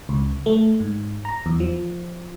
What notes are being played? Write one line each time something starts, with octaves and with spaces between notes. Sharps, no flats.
C#2
A3
G#2
A#5
E2
F3